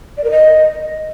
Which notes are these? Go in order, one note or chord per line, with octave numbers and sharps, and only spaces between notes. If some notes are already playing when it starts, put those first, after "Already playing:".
D5
A#4
D#5